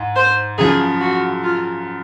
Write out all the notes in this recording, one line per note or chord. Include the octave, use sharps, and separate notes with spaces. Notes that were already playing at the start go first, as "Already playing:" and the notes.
Already playing: G#2
C5
F#2 C#3 F3 G#4
F#4
F4